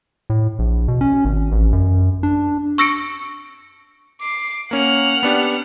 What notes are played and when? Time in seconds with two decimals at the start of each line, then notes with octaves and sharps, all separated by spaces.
0.30 A2
0.59 A#1
0.88 B2
1.01 C#4
1.25 G#1
1.52 A1
1.72 F#2
2.23 D4
2.78 C#6 E6 A#6 C#7 D7
4.21 D6 C7
4.71 A#3 C#4 F#5 F6
5.23 B3 D4 G4